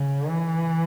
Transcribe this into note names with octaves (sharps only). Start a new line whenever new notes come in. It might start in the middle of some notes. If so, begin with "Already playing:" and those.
Already playing: C#3
E3